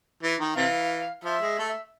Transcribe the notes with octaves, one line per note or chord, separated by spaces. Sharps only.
E3
D#3
C3 E3 F5
F3 E5
G#3
A3